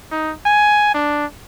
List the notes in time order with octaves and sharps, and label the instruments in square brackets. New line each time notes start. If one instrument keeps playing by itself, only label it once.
[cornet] D#4
G#5
D4